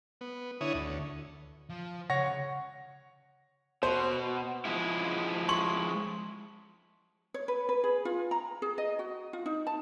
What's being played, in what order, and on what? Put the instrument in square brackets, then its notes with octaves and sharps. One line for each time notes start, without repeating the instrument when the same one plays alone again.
[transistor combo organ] B3
D3 E4 C#5 D#6
D2
[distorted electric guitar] F3
[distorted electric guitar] C#2 [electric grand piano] C#5 C#6 A#6 [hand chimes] F#5
[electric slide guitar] B2 [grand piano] C5
[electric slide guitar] F3 G#3 E4
[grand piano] C6 C#6 F#7
[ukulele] C#5
B4
B4
G#4
F4
A#5
G#4
D#5
F#4
F4
D#4
A5